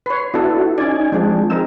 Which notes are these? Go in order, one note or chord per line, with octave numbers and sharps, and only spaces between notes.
B4 C#5 C6
B3 D4 E4 F#4 A4
C#4 D#4 D5 G#5
F3 G#3 C4 D4 G#4
C4 D#4 A#4 E6